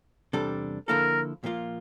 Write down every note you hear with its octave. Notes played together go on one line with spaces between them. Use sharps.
E2 C3 G3 D4 A4
D3 F3 A#3 E4 A4 A#4
A#2 F3 A#3 F4